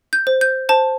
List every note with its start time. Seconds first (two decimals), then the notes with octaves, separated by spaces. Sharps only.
0.13 G6
0.27 C5
0.41 G6
0.69 C5 A5